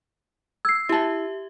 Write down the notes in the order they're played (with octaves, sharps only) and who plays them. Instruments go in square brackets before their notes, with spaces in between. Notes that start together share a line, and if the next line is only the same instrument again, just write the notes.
[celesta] E6 C7 [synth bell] G#6
[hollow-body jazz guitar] E4 A5 [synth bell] G4 E5